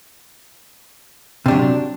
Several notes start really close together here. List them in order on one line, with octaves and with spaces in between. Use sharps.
C3 D4 F#3